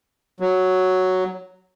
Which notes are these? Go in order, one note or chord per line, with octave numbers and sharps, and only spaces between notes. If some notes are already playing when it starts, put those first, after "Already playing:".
F#3